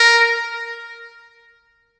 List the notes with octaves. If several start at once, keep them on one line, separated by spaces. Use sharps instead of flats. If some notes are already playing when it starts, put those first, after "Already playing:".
Already playing: A#4